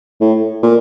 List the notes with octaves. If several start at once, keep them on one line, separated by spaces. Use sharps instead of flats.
A2
A#2